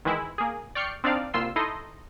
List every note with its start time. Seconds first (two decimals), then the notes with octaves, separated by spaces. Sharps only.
0.05 D#3 E3 G#3 E4
0.38 A#3 G#4
0.75 D5 G5 C#6 F6 C7 C#7
1.04 C4 D4 D#4 D5 F5
1.34 C2 A#3 F4 C6 E6 C7
1.56 D#4 E4 A4 D#5 C6